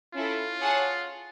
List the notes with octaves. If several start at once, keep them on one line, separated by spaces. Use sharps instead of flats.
C#4 E4 F4 A4
G#4 C#5 F#5 A5